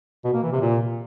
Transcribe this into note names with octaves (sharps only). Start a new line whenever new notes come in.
B2
A#3
E3
C3
A#2